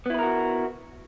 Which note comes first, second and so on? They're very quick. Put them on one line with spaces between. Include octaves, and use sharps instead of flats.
B3 E4 B4 A#4 F#4